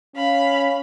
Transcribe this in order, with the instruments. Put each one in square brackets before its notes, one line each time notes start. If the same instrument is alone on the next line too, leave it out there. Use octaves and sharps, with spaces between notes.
[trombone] C#4 [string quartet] F5 B5